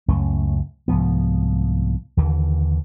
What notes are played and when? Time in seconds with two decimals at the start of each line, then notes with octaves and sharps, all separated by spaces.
0.08 C#2 F#2 A3 C#4
0.88 C2 G#2 F3 B3
2.17 D#2 D3 E3